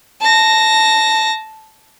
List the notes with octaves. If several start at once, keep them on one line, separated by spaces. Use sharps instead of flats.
A5 A#6